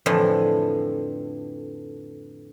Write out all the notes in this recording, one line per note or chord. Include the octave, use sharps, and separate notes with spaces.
F2 A2 D3 E3